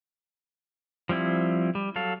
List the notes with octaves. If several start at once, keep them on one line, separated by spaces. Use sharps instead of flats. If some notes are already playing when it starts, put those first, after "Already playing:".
F3 G3 C4 E4
G3
F#3 A4 F5